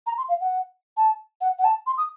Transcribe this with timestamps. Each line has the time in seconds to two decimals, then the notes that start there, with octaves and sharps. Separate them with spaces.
0.07 A#5
0.18 C6
0.29 F5
0.41 F#5
0.97 A5
1.41 F#5
1.59 F#5
1.64 A5
1.87 C6
1.98 D#6